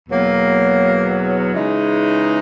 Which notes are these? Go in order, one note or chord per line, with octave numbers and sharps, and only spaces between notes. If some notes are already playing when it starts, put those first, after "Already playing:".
E2 B2 F#3 A#3
C#3 E3 G#3 D#4